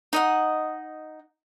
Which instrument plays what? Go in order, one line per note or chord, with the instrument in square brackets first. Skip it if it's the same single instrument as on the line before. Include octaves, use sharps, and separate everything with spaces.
[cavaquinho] D#4 D#5 F#5